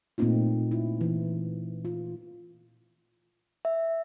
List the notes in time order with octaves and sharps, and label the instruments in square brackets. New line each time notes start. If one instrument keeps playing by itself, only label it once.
[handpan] A#2 A3 A#3 C4 D#4 F4
E4
E3
F4
[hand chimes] E5